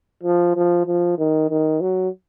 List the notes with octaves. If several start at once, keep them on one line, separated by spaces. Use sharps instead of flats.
F3
F3
F3
D#3
D#3
F#3